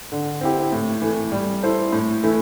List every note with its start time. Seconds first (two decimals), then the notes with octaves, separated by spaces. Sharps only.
0.12 D3
0.41 C4 E4 G4
0.72 A2
1.02 E3 A3
1.32 G3
1.63 E4 A4 C5
1.92 A2
2.23 E3 A3 E4